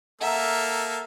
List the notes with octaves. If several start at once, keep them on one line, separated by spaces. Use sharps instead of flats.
A#3 A4 E5 F#5 A#5 E6